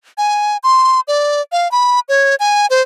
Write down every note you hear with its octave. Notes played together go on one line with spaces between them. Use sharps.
G#5
C6
D5
F5
B5
C#5
G#5
C5